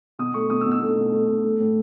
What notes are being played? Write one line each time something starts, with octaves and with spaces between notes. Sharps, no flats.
B2 D#6
A3 C#6
B2 D#6
E6
B2
E6
A3
B2
A3
B2
A3
A2